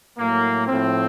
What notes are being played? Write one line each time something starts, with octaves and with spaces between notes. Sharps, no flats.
A2 F#3 A#3
A2 F3 C4